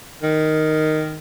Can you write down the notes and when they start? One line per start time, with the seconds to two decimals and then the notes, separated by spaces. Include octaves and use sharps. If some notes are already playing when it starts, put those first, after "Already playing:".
0.22 D#3